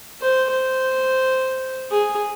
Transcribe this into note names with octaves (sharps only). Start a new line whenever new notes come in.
C5
C5
G#4